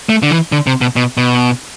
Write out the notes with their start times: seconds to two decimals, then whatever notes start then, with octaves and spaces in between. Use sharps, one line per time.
0.09 A3
0.22 D3
0.31 E3
0.52 D3
0.67 C3
0.81 B2
0.96 B2
1.17 B2